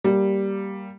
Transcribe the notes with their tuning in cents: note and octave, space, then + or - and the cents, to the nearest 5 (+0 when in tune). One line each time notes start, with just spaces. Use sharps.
G3 -5 A#3 +5